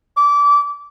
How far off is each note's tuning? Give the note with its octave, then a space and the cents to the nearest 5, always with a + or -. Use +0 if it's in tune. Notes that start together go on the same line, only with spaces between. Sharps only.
D6 -25